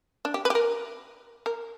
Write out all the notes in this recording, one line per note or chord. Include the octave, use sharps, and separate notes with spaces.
D4
G4
B4
G4
A#4
A#4